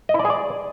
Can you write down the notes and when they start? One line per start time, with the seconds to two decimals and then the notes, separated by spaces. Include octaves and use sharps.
0.09 D#5
0.14 E4
0.20 D5
0.25 G#4
0.30 D5